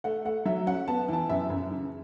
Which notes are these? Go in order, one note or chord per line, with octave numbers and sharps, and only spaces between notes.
A3 F#5
A3 F#5
F#3 E5
C#4 F#5
B3 A5
E3 A5
F#2 E5
F#2
C#3